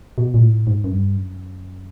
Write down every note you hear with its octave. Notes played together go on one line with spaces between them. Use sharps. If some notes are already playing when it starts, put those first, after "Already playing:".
B2
A#2
A2
G#2
F#2
G2
F#2